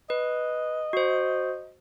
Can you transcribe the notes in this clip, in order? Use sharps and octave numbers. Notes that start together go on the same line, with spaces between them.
B4 D#5
F#4 C5